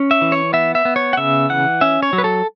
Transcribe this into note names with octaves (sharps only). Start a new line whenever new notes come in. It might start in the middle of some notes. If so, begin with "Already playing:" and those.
Already playing: C#4
E5
E3
C#5
B3 E5
E5
B3
C#5
F#5
C#3 E5
E3 F#5
C#4 E5
C#5
F#3
B4
A4